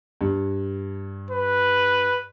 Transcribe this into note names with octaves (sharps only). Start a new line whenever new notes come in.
G2
B4